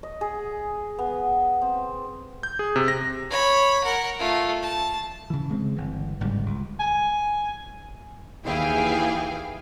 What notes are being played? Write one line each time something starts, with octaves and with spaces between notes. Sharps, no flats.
D#5
G#4
B3
C4
G6
G#4
C3
A#6
C#5 B5
A#4 F#5
A3 F4
A5
C#3 E3
C#3 G#3 A3 C4
G1 E3
G1 G#2 C#3 G3
C#2
G#5
D#2 E3 E4 G#4 F5 G5